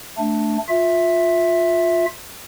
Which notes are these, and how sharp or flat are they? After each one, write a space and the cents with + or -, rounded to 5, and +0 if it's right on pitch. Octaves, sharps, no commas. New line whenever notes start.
A3 +0 D4 +0
F4 +20 E5 +0